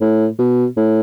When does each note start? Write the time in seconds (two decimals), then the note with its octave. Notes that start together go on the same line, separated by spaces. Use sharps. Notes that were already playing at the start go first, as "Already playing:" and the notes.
0.01 A2
0.39 B2
0.77 A2